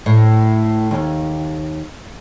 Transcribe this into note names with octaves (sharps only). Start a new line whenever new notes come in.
A2
D#2